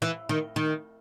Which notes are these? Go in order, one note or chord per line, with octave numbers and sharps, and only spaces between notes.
E3
D#3
D#3